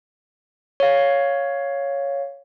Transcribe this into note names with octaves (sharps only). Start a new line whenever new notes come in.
C#5 F5